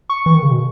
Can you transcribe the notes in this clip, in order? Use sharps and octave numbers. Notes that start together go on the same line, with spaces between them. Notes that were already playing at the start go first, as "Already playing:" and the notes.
C#6
E3
D#3
C#3
B2